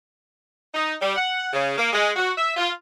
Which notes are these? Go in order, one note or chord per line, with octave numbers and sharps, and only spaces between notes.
D#4
G3
F#5
C#3
A#3
G#3
F#4
E5
F4